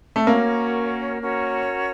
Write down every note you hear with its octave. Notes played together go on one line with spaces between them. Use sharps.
A3
A#3 C#4 F#4 A#4 C#5
C#4 F#4 A#4 C#5